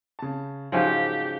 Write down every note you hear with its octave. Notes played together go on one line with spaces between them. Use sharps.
C#3 A5
G#2 C#3 F3 F#3 G4